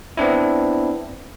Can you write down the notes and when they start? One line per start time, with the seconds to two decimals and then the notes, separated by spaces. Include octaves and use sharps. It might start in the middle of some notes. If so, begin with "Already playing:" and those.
0.17 B3 C4 D4 E4